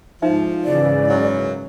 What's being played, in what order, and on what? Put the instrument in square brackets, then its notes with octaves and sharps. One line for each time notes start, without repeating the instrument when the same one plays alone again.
[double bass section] G#2 [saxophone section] F3 [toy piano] D#4 E5
[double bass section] G#2 C#3 E3 [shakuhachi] D5
[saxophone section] F#2 F#3